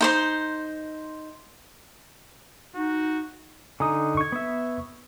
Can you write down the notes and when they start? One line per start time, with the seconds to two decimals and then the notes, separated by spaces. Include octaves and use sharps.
0.01 D#4 C5 C6
2.75 D#4 F#4
3.80 D3 D#4 G#5 A#5 D#6
4.17 C#6 G#6
4.32 B3 E5